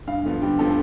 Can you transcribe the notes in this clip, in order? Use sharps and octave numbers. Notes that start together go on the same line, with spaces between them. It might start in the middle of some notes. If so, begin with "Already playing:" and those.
G2 F5
D3 F3 B3
G2 G4
D3 F3 B3 A4